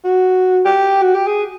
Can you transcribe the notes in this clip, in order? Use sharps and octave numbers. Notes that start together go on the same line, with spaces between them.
F#4
G4
F#4
G4
G#4